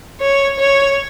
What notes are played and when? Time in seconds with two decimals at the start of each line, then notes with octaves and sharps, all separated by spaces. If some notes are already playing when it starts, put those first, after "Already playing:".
0.21 C#5
0.59 C#5